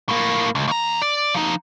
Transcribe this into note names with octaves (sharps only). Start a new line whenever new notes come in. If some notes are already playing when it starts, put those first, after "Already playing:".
A2 A#3
C#2
D#2 A#5
D5
F3 D#4